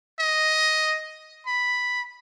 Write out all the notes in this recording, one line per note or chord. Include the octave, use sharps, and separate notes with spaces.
D#5
B5